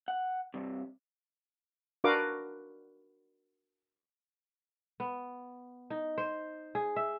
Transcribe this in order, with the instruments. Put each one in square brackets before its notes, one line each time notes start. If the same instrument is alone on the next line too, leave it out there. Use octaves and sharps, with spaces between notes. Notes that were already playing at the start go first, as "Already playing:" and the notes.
[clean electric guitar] F#5
C2 G2 C3
[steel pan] D4 F#4 A#4 B4 F5 D6
[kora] B3
D#4
C5
G#4
E5